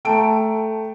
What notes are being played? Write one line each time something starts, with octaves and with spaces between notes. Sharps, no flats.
A3 G5 A5 A#5 D7